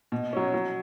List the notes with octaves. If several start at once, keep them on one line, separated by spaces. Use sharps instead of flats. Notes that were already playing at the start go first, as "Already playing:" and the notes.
B2
F#3 C#4
F#3